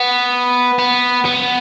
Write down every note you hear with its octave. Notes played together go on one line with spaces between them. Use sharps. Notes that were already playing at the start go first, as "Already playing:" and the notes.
Already playing: B3
B3
B3